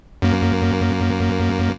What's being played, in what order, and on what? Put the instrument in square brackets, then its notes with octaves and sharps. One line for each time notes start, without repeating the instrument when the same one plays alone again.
[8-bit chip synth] F#2 A#3